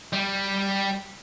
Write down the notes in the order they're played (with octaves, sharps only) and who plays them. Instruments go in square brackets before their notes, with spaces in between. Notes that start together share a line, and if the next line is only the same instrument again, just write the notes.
[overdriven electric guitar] G3